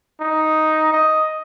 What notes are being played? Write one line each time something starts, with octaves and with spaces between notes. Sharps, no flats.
D#4
D#5